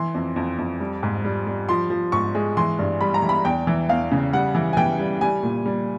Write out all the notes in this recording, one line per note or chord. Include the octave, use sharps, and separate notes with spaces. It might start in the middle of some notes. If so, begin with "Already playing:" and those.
Already playing: E3 C6
F2
F2
F2
G3
G#2
G3
G3
F3 C6
F3
G#2 C#6
G#3
E3 C6
G2
G3 B5
A#5
E3
B5
E2 G5
E3
E2 F5
C#3
G3 F#5
E3
G#5
E3 G5
G3
G3 G#5
A#2
G3